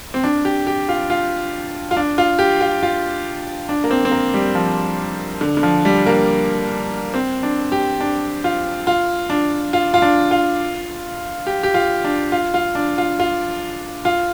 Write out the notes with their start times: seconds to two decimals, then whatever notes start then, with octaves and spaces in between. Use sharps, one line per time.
0.14 C4
0.24 D4
0.45 G4
0.67 G4
0.89 F4
1.10 F4
1.91 F4
1.97 D4
2.18 F4
2.39 G4
2.61 F4
2.83 F4
3.69 D4
3.84 A#3
3.91 C4
4.05 C4
4.11 A#3
4.34 G3
4.55 F3
5.41 D3
5.57 D3
5.63 F3
5.85 G3
6.06 A#3
7.14 C4
7.43 D4
7.72 G4
8.00 D4
8.44 F4
8.87 F4
9.30 D4
9.73 F4
9.94 F4
10.02 D4
10.31 F4
11.47 G4
11.63 G4
11.74 F4
12.04 D4
12.32 F4
12.54 F4
12.75 D4
12.98 F4
13.20 F4
14.05 F4